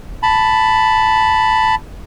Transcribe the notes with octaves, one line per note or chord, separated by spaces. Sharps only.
A5 B5